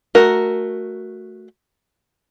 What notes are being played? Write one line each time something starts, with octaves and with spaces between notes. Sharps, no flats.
A3 F#4 A#4